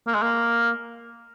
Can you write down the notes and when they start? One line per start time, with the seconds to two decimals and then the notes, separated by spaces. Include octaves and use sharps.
0.07 A#3
0.14 G#3
0.22 A#3